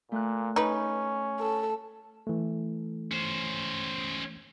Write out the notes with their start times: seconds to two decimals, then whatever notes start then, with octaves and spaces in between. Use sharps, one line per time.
0.12 A#2 A3 F#6
0.56 C#4 D#4 B4
1.39 A4
2.27 E3 A3
3.12 C#4 C5